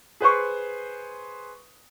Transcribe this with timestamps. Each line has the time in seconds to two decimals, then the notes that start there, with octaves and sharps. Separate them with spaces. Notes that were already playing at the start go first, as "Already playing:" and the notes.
0.20 G#4 B4 C5 C#6